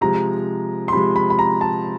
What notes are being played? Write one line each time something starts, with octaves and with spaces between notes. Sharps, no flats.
C3 F3 G#3 A#5
C6
C3 F3 G#3 B5
B5
B5
A#5
A5